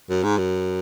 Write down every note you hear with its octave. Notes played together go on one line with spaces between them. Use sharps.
F#2
G#2
F#2